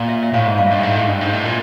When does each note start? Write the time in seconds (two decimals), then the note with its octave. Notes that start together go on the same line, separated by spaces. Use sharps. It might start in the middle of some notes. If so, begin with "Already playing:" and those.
Already playing: A#2
0.08 E5
0.23 E5
0.34 A2 F5
0.46 G#2
0.58 G2 F5
0.67 E5
0.71 G2 D#5
0.82 G#2 E5
0.96 A2
1.02 G#2
1.08 G2
1.21 G#2
1.33 A2
1.45 A#2